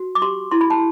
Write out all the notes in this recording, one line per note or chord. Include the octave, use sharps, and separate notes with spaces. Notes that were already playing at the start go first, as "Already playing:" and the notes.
Already playing: F#4
D6
G4 C6
E4 C6
B5
A5